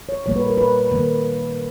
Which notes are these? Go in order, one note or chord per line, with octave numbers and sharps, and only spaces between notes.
C#5
A#2 G3 A#3 C#5
B4
A#4
B4
D#3 A#3